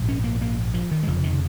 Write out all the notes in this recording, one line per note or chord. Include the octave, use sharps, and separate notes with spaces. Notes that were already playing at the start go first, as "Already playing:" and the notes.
Already playing: A#1 G#2
C#4
A#3
A#3
F3
D#3
G#3
F1 F2 C#3 F3
D#3